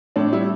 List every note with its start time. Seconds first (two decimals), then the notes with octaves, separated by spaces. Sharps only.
0.16 A2 D4
0.33 G3 E4